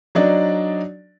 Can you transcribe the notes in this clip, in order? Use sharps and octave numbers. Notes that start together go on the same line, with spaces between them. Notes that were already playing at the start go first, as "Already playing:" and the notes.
F#3 D4 D#4 D5